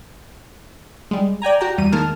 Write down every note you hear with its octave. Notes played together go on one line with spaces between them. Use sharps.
G3 G#3
D5 G5 G#5 A#5
F#4 G4 G5 A#5
E2 G3 D#7
D#3 G#3 A#3 A#4 A5 F6